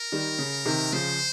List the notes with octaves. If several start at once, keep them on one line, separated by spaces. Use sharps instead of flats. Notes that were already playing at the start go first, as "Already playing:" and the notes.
Already playing: A#4
D#3 G3
C#3
C3 D#3
C#3 F3 C5